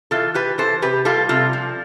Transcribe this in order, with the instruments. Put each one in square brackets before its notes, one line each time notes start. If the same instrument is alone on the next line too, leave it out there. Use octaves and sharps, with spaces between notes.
[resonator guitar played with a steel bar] E3 F4 A4
E3 G4 B4
E3 A4 C5
C3 G4 B4
G3 F4 A4
C3 F4 A4
F3